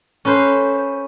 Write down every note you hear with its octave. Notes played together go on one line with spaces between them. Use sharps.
C#4 A4 B4 C5